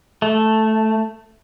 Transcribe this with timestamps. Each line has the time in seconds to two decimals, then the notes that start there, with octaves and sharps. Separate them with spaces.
0.22 A3